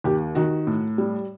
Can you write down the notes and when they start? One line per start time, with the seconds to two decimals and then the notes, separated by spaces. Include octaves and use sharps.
0.04 D#2 G4
0.35 D#3 F#4
0.67 A2
0.98 G3